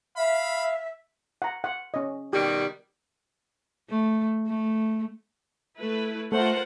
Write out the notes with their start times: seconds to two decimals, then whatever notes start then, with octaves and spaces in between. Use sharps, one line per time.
0.17 E5 F5 B5
1.42 F#5 A#5
1.64 F#5
1.94 C#4 D#5
2.33 B2 D#3 G3 G4
3.90 A3
4.48 A3
5.78 A3 E4 B4
6.32 A3 F4 A#4 C5 F#5